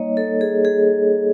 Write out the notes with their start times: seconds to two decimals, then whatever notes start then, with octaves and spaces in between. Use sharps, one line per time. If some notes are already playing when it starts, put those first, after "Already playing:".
Already playing: G3 A#3 D#4 C#5 D#5
0.17 A4
0.41 G#4
0.65 G#4